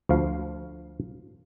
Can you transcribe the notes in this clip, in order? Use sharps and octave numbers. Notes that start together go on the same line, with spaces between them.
D2 F3 F5